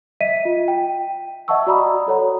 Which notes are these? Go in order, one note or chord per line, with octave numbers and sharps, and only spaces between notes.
D#5 E5 B6 D#7
F4
G5
D#5 E5 F#5 A5 C#6 E6
F#4 D5 A#5 B5 D#6
F#4 A4 C#5 F#5 A#5